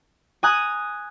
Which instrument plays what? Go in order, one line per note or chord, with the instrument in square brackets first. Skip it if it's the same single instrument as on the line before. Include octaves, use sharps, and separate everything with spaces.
[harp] G#5 A#5 D#6 F#6